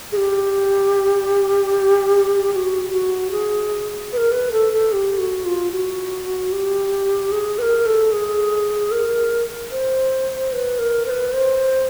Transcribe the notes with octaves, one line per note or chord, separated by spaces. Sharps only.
G#4
G4
G4
F#4
F#4
G#4
B4
A#4
B4
A4
A4
G4
F#4
F4
F#4
G4
G#4
B4
A#4
A4
G#4
A#4
C5
B4
A#4
C5
B4
C5